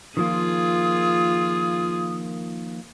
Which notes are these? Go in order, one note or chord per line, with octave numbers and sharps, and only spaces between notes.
D#3 F3 A#3 F4 G#4 D#6